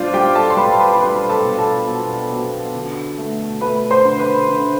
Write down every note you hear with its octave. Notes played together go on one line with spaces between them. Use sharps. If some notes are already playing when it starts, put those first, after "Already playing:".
Already playing: B2 G3 D4 F4 C5 D5
G3 G4 G5
A4 A5
C6
G3 B4 B5
B4 B5
G3 B4 B5
A4 A5
B2
A4 A5
B2
B2
D3
A3
A3 B4 B5
C5 C6
D3
B4 B5
D3